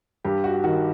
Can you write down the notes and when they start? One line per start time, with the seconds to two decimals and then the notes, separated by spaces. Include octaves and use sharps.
0.24 G2 G4
0.44 F#4
0.64 D#3 F#4